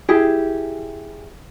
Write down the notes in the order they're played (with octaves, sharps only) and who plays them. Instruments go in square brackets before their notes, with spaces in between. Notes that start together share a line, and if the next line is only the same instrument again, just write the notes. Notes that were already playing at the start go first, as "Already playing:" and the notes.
[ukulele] E4 G4 G#4